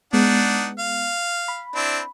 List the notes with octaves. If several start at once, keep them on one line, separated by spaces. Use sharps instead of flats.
G#3 B3 D4 D#4 F#5
F5
B5
C4 D4 E4